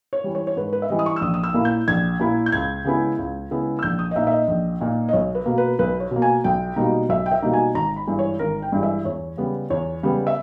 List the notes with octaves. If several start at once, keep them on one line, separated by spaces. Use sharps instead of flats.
C#5
E3 G3
C#5
C#5
G#2 B4
B4
E5
E3 G3 D#5
D#6
C#6
E6
A#1 D#6
D#6
E6
A#2 A#3 E4
G6
A#1 G#6
A#2 A#3 E4
G6
C#2 G#6
C#3 G#3 B3 E4
C#2
C#3 G#3 B3 E4
E6
A#1 G6
D#6
D#5
A#2 A#3 D#4 E5
E5
D#5
A#1
A#2 A#3 D#4
D#5
B1 C#5
B4
B2 A#3
B4
B1 B4
C#5
B2 A#3
G#5
B1 G5
B2 G3 A#3 D#4
B1 E5
G5
E5
B2 G3 A#3 D#4
G#5
G#1 A#5
B5
G2 E3 G#3
C#5
G#1 A#4
G5
G2 E3 G#3
E5
E2 C#5
C#3 G3 B3
E2 C#5
C#3 G3 B3
E5